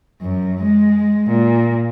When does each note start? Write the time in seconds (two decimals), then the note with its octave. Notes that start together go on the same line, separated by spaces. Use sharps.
0.21 F#2
0.61 G#3
1.28 A#2